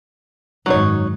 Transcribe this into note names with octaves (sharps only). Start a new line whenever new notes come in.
G#1 F#2 F#3 D#4 C#5